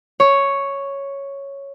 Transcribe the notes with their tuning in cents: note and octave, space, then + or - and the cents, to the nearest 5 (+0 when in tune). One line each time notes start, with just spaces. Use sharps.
C#5 +0